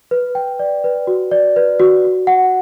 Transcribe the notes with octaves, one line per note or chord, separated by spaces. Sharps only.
B4
G5
D5
B4
F#4
D5
B4
F#4
F#4
F#5